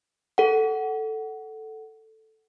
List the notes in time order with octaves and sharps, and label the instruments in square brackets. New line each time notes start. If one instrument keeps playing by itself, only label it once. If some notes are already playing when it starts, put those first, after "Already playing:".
[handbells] A4 F#5